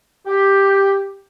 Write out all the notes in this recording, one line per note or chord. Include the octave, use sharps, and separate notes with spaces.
G4